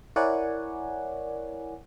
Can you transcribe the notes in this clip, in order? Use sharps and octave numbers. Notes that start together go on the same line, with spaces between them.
E4 A#4 C#5 D5 F#5 G#5